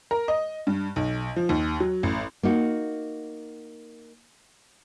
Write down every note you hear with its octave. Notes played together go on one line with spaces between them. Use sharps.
A#4
D#5
G2
B1
F3
D#2
F#3
A1
A#3 D#4 F#4